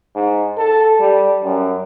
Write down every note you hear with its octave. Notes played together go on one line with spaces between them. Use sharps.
G#2
A4
G3
F#2